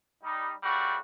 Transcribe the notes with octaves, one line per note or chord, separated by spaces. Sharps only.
G3 D#4
C#3 G3 A3 F#4